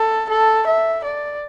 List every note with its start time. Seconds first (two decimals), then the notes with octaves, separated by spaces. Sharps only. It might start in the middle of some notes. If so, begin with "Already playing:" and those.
Already playing: A4
0.30 A4
0.67 E5
1.04 D5